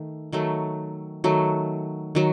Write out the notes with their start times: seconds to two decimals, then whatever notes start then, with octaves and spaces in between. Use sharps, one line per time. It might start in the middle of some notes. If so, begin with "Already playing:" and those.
Already playing: D#3 A3
0.32 D#3 F#3 A3
1.24 D#3 F#3 A3
2.15 D#3 F#3